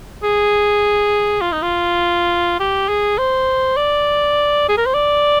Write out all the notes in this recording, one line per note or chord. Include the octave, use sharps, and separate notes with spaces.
G#4
F4
D#4
F4
G4
G#4
C5
D5
G#4
A#4
C5
D5